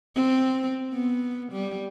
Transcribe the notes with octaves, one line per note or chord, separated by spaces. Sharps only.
C4
B3
G3